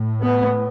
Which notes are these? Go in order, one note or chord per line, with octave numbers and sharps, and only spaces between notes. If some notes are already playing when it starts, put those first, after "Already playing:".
Already playing: A2
B3